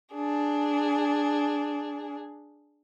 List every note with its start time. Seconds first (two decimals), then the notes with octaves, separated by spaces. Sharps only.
0.14 D4 G#4